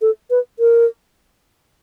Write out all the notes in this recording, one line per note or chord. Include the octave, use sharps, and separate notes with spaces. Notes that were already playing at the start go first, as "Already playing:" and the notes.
A4
B4
A#4